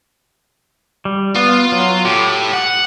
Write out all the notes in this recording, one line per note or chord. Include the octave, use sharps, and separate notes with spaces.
G3
B3 F4
F#3
A2 G4
F#5